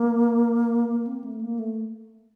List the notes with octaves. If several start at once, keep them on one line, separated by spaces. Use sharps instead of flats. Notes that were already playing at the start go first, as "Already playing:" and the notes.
Already playing: A#3
A#3
C4
A3
A#3
A3